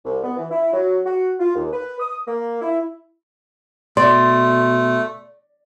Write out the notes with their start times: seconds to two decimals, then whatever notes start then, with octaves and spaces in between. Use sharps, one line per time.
0.05 C2
0.24 B3
0.37 E3
0.51 E4
0.73 F#3
1.06 F#4
1.40 F4
1.56 D#2
1.73 B4
2.00 D#6
2.28 A#3
2.62 E4
3.97 B2 A3 D5 C6